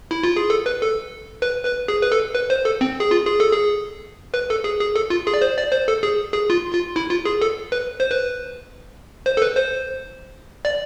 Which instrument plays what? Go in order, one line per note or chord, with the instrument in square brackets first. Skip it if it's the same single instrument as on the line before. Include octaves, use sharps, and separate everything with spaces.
[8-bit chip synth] E4
F4
G#4
A4
B4
A4
B4
B4
G#4
B4
A4
B4
C5
A4
C4
G#4
F4
G#4
A4
G#4
B4
A4
G#4
G#4
A4
F4
G#4
D5
C5
D5
C5
A4
G#4
G#4
F4
F4
E4
F4
G#4
A4
B4
C5
B4
C5
A4
B4
C5
D5